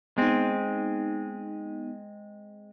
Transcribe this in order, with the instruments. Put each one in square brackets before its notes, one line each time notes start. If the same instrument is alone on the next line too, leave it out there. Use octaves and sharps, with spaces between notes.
[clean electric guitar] G#3 C4 [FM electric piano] B3 D#4